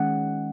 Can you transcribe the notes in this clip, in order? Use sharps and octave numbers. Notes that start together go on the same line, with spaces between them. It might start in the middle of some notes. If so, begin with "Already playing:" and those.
Already playing: D#3 G#3 C#4 F#5